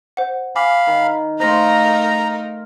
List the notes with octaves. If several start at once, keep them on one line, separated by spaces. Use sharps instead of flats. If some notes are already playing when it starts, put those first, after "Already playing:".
C5 F#5
F5 G#5 B5 D6
D#3
A3 D#4 A#4 C5 F5 A#5 C6 A#6